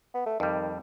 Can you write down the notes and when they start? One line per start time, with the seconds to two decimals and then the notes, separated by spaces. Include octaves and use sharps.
0.14 B3
0.26 A3
0.40 F2 D#3 G3